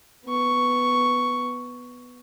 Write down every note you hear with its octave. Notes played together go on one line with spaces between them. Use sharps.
B3 C#6